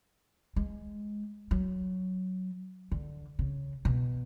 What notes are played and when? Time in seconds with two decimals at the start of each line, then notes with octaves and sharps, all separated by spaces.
0.56 G#3
1.51 F#3
2.92 D3
3.39 C#3
3.85 B2